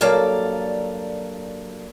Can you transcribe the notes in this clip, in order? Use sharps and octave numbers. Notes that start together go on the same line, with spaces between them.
G2 F#3 A#3 A4 D5 F5